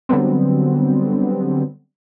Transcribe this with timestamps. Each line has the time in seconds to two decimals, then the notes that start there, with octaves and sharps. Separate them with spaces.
0.09 D3 F#3 G3 B3 C4